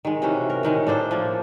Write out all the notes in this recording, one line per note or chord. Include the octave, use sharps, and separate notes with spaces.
D#3 G#3
C3 E3 C#4 F#4
A#4
A2 D#3 G#3 C#4
A2 D4 A4 C5
F3 A#3